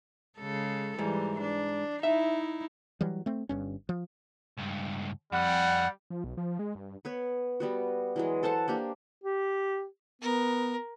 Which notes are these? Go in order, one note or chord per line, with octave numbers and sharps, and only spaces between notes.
C#3 G#3 A4
G#2 E3 G3
D4
D#4 E4 E5
E3 F#3 G3
A3 C4
G1 G2 C#4
F3
C#2 G2
F2 G3 F#5
F3
B1
F3
G#3
G2
B3 B4 C#5
G3 B3 F#4
E3 F#3 G#3
A4 C5 F#5 A5
A#3 D4 G4
G4
B3 A#4